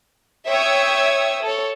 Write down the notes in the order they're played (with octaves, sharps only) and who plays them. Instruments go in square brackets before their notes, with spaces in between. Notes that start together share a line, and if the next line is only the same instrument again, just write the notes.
[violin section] C#5 E5 G5 D#6 E6 G#6
A4 C#5